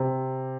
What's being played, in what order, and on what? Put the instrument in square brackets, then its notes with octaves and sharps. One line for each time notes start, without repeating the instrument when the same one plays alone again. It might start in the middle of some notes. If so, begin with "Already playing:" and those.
Already playing: [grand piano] C3